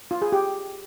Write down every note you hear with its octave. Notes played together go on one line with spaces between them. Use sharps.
F4
G#4
G4